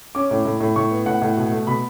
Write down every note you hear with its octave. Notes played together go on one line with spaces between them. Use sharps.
C#4 D6
A2
A2
A2
A2 C#6
B3
A2 F#5
A2
B2
A3
B2 B5